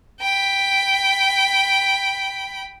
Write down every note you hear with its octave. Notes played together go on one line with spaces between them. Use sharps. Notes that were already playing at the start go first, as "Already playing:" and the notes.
G5 B5